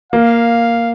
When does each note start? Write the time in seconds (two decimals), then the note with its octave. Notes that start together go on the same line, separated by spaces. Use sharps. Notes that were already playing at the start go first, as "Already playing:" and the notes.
0.13 A#3 F5